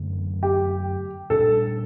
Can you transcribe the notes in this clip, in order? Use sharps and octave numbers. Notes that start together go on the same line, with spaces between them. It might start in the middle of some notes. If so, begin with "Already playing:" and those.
Already playing: F#2 D3 F#3 A3
G4
A#2 G3 D4 A4